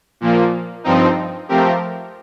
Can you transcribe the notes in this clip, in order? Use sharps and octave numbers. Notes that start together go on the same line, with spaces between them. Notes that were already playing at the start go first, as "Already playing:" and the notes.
A#2 F3 A#3
G2 F3 C4 D#4
F3 A3 C4 G4 A#4